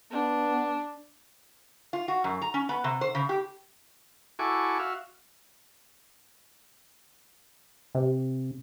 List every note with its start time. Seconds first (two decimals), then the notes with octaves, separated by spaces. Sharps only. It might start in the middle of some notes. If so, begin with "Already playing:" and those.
0.11 B3 D4
1.93 F4
2.08 F#4
2.24 F#2
2.41 A#5
2.54 C#4
2.69 B3
2.84 C3
3.01 C5
3.15 C#3
3.29 G4
4.39 E4 F#4 A4 G#5 C#6 D6
4.79 F#4 E5 F5
7.95 C3